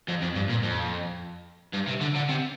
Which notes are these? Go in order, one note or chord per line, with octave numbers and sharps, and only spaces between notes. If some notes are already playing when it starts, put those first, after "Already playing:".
F2
F2
G2
A#2
F2
G2
C3
D3
D3
C3